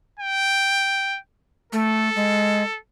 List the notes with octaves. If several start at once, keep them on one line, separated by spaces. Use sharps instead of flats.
G5
A3 A4
G#3